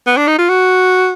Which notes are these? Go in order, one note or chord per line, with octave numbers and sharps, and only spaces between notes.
B3
D4
D#4
F4
F#4